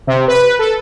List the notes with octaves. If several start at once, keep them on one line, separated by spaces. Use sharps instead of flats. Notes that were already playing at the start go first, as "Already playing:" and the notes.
C3
B4
A4